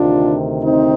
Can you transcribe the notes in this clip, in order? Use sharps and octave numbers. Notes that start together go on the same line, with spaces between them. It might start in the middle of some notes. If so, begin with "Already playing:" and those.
Already playing: D2 C3 D#3 D4 F4
C4 D#4